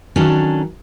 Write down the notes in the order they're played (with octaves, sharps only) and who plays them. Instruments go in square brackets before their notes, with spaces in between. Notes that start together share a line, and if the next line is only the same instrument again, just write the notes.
[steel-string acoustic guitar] D#3 F#3 C#4 D4 A4